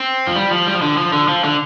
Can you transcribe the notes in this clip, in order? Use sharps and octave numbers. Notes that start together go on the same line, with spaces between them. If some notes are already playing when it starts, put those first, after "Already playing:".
Already playing: C4
F3
G3
F3
G3
F3
D3
F3
D3
F3
D3